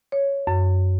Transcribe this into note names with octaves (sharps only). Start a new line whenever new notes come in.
C#5
F#2